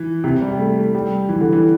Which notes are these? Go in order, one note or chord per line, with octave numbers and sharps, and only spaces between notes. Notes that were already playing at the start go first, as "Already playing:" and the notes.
Already playing: E3
C3
G3
A3
G3
E3
D3
E3